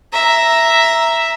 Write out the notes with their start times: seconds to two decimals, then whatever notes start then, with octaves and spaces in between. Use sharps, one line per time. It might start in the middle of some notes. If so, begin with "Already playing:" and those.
0.12 E5 A#5